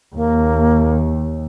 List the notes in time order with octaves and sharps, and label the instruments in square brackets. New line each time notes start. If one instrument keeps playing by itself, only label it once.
[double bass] D#2 [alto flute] A#3